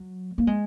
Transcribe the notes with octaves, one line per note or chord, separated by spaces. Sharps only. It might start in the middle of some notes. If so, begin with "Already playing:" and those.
Already playing: F#3
A#3
G#3